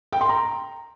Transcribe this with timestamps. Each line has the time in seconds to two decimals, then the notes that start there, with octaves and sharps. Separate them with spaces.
0.13 G5
0.21 C6
0.29 A#5